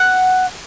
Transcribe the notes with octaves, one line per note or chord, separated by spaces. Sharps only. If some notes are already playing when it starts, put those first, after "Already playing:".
Already playing: F#5